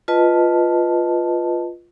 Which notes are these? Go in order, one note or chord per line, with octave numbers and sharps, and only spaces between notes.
F4 B4 D#5 A5